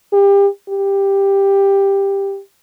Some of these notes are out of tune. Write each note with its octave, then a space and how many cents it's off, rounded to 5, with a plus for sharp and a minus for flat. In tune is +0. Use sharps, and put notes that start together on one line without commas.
G4 +30
G4 +10